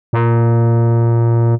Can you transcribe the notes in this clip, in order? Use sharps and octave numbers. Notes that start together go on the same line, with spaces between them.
A#2